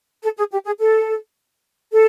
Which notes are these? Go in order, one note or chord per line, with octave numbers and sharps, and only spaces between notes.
A4
G#4
G4
G#4
A4
A4